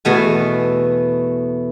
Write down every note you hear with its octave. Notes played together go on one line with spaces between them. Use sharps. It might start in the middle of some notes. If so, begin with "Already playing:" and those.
E2 B2 A3 G#5